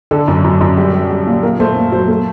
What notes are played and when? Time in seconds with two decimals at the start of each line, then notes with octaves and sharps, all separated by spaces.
0.11 D3 A4
0.28 F#2
0.44 F#2
0.61 F#2
0.77 G3
0.94 G3
1.11 G3
1.26 A#2
1.43 A#2 A#4
1.60 A3 C5
1.76 A#2
1.92 F#3 C5
2.08 A3